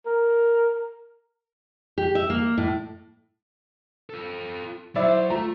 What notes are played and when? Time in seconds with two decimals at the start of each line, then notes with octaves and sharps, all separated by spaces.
0.06 A#4
1.98 G4
2.15 E5
2.30 A#3
2.58 A2
4.10 F4 A4
4.96 F#3 E4 C5 D5 E5
5.30 A3 F4 A#5